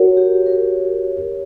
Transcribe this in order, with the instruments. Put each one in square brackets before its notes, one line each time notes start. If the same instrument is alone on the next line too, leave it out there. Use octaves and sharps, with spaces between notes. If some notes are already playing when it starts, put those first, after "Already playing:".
Already playing: [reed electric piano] F#4 [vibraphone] A#4 C#5
[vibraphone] G4
A#4